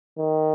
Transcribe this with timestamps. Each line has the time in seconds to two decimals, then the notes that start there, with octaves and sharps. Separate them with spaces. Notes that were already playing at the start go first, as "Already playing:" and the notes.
0.18 D#3